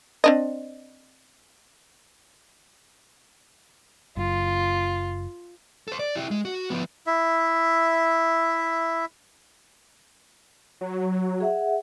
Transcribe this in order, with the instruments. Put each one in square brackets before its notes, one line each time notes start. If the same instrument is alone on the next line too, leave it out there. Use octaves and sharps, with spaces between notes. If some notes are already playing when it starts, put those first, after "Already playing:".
[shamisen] C4 D4 D#5
[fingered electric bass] F#1 [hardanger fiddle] F4
[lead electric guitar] A4 C5
D5
E4 G4
G#3
F#4
F3 B3
[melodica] E4 E5
[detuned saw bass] F#3
[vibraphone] G#4 E5 F#5